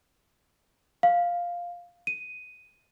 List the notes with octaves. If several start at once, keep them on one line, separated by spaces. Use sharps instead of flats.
F5
D#7